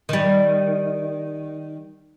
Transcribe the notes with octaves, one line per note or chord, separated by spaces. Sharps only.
D#3 G3